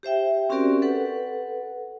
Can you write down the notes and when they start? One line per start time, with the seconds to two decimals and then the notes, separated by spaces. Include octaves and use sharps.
0.03 G4 C5 E5 G5
0.49 C4 C#4 F#4 G4 A#4 D5
0.82 A4 B4 F#5